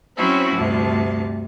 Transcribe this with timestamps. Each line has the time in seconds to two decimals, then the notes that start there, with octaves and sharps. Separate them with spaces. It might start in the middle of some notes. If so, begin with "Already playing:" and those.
0.17 F#3 C4 C#4 E4 F#4 C5
0.56 D2 G2 C3 A5